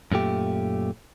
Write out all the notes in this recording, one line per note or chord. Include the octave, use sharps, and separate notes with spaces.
F#2 A#2 A3 G4